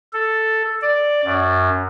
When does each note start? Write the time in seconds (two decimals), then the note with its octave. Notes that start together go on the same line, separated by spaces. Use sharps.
0.13 A4
0.81 D5
1.25 F#2